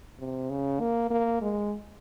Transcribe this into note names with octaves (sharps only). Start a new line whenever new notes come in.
C3
C#3
A#3
A#3
G#3